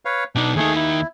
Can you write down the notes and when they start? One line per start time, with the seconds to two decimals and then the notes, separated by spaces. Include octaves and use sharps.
0.05 B4 C#5 F5
0.35 B2 D4 D#4
0.56 D#2 A3 D#4 G#4
0.76 E4